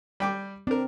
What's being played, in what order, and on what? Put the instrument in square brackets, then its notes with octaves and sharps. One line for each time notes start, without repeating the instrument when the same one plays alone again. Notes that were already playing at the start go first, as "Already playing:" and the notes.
[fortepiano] G3 G5 D6
[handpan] C4 [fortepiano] D4 A#4